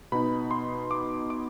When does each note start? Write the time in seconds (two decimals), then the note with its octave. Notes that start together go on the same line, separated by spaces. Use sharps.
0.12 B2 B3 D#4 B5
0.51 C6
0.91 D6
1.30 D6